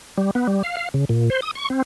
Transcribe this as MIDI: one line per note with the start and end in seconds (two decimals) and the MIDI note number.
0.18 0.31 55
0.35 0.47 59
0.47 0.62 55
0.63 0.76 77
0.77 0.89 77
0.94 1.05 49
1.09 1.30 46
1.30 1.40 72
1.42 1.51 87
1.55 1.69 85
1.70 1.82 60